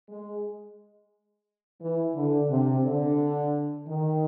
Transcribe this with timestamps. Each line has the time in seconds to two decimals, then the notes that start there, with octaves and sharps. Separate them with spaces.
0.08 G#3
1.80 E3
2.15 D3
2.50 C3
2.84 D3
3.87 D#3